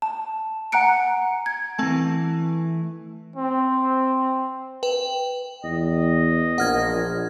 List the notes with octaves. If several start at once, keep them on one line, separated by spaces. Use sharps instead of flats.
A5
F#5 G#5 A#5 F#6 C#7 D7
G#6
E3 A3 C4 G#5 A5
C4
B4 G5
E2 D#5
A#1 F#5 F6 G#6